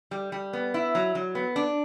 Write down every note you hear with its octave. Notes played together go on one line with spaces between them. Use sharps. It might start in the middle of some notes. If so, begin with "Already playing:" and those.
G3
G3
B3
E4
F#3
F#3
B3
D4